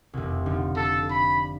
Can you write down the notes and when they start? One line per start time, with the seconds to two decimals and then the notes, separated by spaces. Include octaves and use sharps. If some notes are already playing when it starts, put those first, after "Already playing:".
0.13 F1 C2
0.46 D3 F3 D#4
0.76 D4 A4
1.10 B5